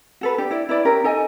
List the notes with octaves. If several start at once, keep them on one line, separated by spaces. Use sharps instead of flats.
F#4 A4 B4
D4 G4
E4 D5
E4 B4 D5
C#4 G4 A#4
D#4 A4 D#5 G#5